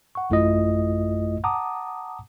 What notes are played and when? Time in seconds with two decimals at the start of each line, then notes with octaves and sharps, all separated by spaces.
0.15 F#5 C#6
0.30 A1 F#2 A3 E4 F4 D#5
1.44 F#5 A5 A#5 D6 D#6